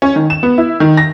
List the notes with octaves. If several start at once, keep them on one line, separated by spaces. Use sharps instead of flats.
C#4
D#3
E7
B3
E4
D#3
A#6